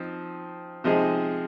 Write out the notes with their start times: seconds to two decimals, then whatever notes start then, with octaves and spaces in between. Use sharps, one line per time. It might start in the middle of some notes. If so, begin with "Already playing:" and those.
Already playing: F3 C4 D#4
0.84 C3 F3 G#3 D#4 G#4